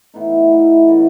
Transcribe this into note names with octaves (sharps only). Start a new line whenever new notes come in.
A2 E3 B3 D#4
A2 E3 B3 D#4
C#3 E3 B3 F#4